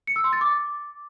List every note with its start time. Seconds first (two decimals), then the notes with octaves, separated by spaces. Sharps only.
0.07 C#7
0.16 E6
0.24 C6
0.33 A6
0.41 D6